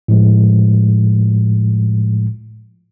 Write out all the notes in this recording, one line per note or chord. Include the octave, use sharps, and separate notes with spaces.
A2 F3 G#3